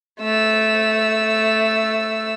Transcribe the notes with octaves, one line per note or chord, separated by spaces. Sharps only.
A3 E6